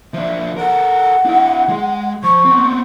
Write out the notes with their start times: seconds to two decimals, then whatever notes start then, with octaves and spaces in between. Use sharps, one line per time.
0.14 F3 D4 E5
0.57 A4 A#4 F#5
1.25 D4 E4
1.69 G#3 G#4
2.23 F3 C#6
2.45 B3 C4